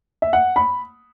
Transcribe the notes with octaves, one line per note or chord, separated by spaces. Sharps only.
E5
F#5
B5